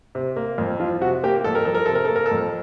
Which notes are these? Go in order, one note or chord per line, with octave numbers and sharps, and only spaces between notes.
C3
A#3
F2
F3 F4
C3 F#4
A#3 G4
F2 A4
A#4
F3 A4
A#4
C3 A4
A#4
A#3 A4
A#4
A4
F2